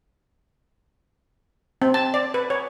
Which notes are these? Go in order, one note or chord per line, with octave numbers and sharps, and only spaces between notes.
C4
A5
D5
B4
C#5